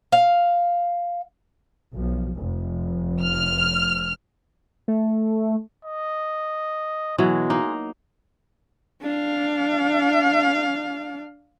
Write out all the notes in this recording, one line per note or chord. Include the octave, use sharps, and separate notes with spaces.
F5
B1 F3
F1
F6
A3
D#5
B2 E3 F#3 G#3
A#3 D#4
D4 F5